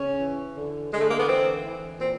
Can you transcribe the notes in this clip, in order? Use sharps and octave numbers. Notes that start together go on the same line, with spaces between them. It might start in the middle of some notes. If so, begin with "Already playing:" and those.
Already playing: C#3 C#4
E3
D3
D3 G#3
A3
A#3
B3
E3 C4
E3
A#2 C4